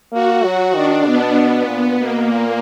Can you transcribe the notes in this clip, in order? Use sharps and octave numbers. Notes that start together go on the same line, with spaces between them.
A#3 F#4
F#3 F#4
D#3 D4
B2 B3
A#2 B3
B2 A#3
A#2 A#3